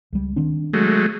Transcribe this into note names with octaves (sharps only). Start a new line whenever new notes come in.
C#2 G3
D#3 C4 D4
F#3 G#3 A3